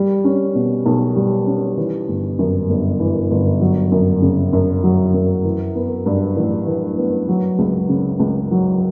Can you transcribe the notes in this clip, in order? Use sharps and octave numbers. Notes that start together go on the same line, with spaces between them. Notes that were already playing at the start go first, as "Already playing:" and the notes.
Already playing: G3
C#4
B2
B1
G3
C#4
E3
G1
F#2
G1
E3
G1
F#3
F#2
C#3
F#2
F#3
F#2
E3
B3
G2
A1
E3
B3
F#3
C#2
C#3
C#2
F#3